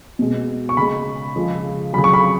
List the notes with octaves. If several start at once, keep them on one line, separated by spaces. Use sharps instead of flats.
B2 G#3
C#6
C#3 G#3 B5
C#3 F3 G#3
C#3 F#3 B5
C#6
B5